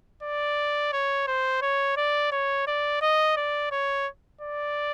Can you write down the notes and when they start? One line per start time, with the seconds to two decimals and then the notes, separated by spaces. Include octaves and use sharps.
0.23 D5
0.93 C#5
1.27 C5
1.62 C#5
1.97 D5
2.32 C#5
2.67 D5
3.02 D#5
3.37 D5
3.71 C#5
4.41 D5